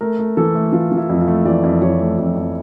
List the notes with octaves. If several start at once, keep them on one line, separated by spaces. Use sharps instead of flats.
A3 A#4
A3
E3 A4
A3
E3 F4
E3
E4
F2
F4
A3
E3 D5
F2
F2 C#5
A3
F2
F2